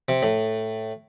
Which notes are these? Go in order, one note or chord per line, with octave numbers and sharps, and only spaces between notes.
C3
A2